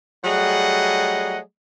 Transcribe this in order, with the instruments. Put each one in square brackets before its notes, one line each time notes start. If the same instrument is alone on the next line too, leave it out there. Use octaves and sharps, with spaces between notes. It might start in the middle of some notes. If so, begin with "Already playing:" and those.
[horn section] F#3 G3 A3 G#4 D#5 F#5